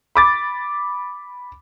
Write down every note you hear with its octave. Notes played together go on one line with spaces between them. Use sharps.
B5 D6 A6